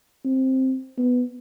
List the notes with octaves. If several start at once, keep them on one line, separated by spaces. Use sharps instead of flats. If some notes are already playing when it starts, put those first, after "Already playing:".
C4
B3